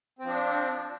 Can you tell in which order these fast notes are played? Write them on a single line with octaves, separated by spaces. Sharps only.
C4 F3 D4